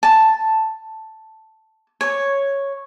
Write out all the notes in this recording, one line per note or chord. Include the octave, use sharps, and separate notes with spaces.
A5
C#5